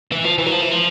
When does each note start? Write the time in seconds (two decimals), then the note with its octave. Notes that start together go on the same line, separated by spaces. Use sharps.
0.12 E3
0.24 F3
0.38 E3
0.46 F#3
0.52 F3
0.61 E3
0.71 F3